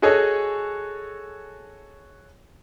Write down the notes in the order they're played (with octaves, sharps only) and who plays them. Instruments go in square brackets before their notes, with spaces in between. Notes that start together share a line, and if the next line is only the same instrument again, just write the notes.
[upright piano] F#4 G#4 A4 C#5 D#5 G#5